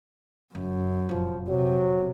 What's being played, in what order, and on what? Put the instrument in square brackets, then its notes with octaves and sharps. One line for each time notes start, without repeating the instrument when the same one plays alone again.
[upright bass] F#1 [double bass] F#2
[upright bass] F1 A#1 [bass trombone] F3
[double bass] C3 [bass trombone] F#3